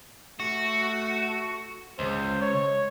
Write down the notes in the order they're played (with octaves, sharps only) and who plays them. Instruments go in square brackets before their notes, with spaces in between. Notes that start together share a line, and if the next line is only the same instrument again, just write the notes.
[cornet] A3 [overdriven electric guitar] F#4
[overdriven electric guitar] C#2 [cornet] C5
[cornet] C#5